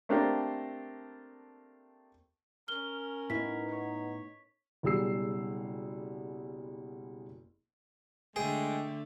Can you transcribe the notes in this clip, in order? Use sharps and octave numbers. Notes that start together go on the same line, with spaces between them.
A3 A#3 C4 D4 G4 A#4
C#4 A#4 F6 G7
A2 B3 D#4 E4 B6
C#5
F#1 B2 G3 G#4 E6 C7
D3 G#3 A3 G#4 G5